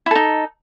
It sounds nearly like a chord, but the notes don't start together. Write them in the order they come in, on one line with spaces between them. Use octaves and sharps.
E4 A4 D#4